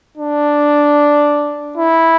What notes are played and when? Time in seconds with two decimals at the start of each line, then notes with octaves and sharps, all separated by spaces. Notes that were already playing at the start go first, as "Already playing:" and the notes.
0.17 D4
1.77 E4